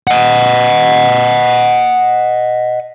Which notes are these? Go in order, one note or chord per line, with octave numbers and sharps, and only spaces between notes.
D#5 F#5